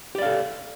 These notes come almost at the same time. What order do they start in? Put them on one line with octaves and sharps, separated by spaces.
G4 D5 F5 A4